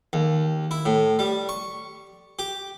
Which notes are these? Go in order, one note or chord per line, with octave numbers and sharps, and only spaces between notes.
D#2
E4
A2
G3
C#6
G4